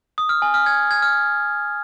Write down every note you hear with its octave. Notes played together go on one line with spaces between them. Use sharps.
D#6
F6
G#5
F6
G#6
G#6
F6